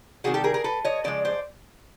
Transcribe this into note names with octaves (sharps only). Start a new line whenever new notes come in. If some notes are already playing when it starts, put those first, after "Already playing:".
C3 D#3 G3 F#4 G#4
G4 A4
G#4 A#4
G#4 A#4
A4 B4
C#5 D#5
C#3 F3 G#3 D5
C5 D5